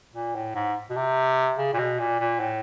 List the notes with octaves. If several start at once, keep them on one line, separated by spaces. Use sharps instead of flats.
A#2
A2
G#2
B2
C3
C#3
A#2
B2
A#2
A#2
A2